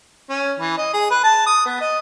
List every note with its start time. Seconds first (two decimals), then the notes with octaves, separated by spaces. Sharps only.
0.29 C#4
0.59 E3
0.78 D#5
0.93 G#4
1.11 B4
1.24 A5
1.46 D#6
1.65 B3
1.80 D#5